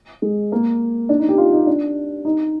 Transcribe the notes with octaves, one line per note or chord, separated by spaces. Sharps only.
G#3
A#3
D4
D#4
G4
F4
D#4
D4
D#4